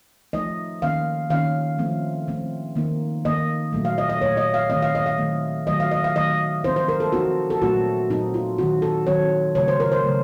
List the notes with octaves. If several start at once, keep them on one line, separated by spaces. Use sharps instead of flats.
F3 A3 D#4 D#5
D#3 A#3 C#4 F5
D#3 A#3 C#4 F5
F3 A3 C4
F3 A3 C4
D#3 A#3 D#4
D#3 A#3 D#4 D#5
A#2 F#3 A3
F5
D#5
D#5
A#2 F#3 A3 C#5
D#5
F5
D#3 F#3 A3 C4 D#5
F5
D#5
F5
D#3 F#3 A3 C4
D#3 F#3 A3 D#5
F5
D#5
F5
D#3 F#3 A3 D#5
F3 C4 D#4 C5
C5
A#4
A4
F3 C4 D#4 F#4
A4
A#2 F#3 A3 C4 F#4
A#2 F#3 A3 C4 D#4
F4
D#3 F#3 C4 F#4
A4
D#3 F#3 C4 C#5
C#3 F#3 A3 C#5
C5
A#4
C5
C#3 F#3 A3